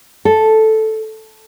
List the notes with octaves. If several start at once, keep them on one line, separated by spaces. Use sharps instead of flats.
A4